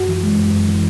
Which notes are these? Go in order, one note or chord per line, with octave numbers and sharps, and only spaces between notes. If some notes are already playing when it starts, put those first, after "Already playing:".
Already playing: F#2 F#4
E3
G#3
F#2
F#2
E3